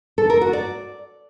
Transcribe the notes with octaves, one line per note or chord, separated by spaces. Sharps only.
A4
A#4
F#4
D5